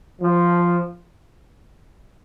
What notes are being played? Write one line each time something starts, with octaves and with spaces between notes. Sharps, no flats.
F3